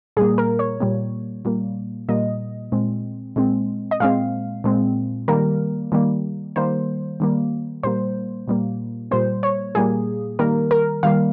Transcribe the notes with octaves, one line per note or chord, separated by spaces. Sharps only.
A#2 G3 A#3 G#4
A#4
C#5
A#2 G3 A#3
A#2 G3 A#3
A#2 G3 A#3 D#5
A#2 G#3 C4
A#2 G#3 C4
D#5
A#2 G#3 C4 F5
A#2 G#3 C4
D#3 G3 A#3 A#4
D#3 G3 A#3
D#3 G3 A#3 C5
D#3 G3 A#3
A#2 G3 A#3 C5
A#2 G3 A#3
A#2 G3 A#3 C5
C#5
A#2 G3 A#3 G#4
D#3 G3 A#3 A#4
A#4
D#3 G3 A#3 F5